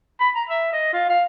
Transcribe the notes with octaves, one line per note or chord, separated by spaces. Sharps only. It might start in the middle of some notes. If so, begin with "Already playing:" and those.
B5
A#5
E5
D#5
F4
F5